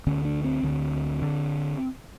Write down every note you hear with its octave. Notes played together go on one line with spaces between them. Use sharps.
D2 D3 C#4
D4
C4
D2 D3
D3